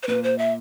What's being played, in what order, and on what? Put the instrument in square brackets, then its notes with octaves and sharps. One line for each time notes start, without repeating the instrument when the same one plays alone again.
[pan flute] C5
[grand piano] A#2 [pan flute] B4
[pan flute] C5
E5